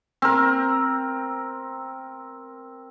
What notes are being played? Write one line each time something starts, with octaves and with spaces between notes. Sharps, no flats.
C4 A#4